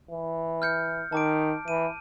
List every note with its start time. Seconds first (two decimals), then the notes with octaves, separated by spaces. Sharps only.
0.11 E3
0.62 F6 G6 C#7
1.12 D#3 A5 D6 D7
1.68 E3 D#7